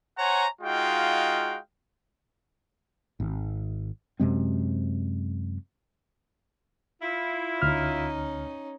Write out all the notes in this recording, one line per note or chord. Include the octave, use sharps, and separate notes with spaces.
C5 C#5 F#5 G#5 A#5
G#3 D#4 F4 F#4 F5 G5
G#1
F#2 C3 G#3 C4
E4 F4
D2 C#4 D#4 F6